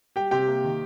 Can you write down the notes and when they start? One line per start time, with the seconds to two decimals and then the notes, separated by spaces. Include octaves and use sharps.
0.16 G3 G4 G5
0.31 C3 G4 G5
0.48 A#3
0.64 D#3